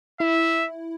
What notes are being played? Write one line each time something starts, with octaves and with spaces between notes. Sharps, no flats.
E4 E5